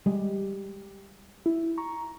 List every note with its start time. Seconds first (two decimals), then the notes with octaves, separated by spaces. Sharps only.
0.06 G3 G#3 G4
1.46 E4
1.77 A#5 C#6